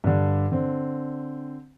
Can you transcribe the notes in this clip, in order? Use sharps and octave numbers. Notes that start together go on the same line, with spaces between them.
G2 D3
D3 C4